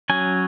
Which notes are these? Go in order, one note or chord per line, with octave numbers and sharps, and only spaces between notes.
F#3 C#4 G#5